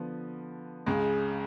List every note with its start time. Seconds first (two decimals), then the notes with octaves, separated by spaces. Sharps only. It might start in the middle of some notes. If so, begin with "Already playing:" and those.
Already playing: D3 F3 B3
0.86 C#2 C#3 G#3